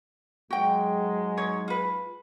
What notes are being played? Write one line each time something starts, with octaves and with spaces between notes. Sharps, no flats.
G#2 F#3 G#3 F#4 G5
D#4 C#5
F4 B4